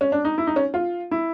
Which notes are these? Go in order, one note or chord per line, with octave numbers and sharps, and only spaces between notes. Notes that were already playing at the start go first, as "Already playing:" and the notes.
C#4
D4
D#4
E4
D#4
C#4
F4
E4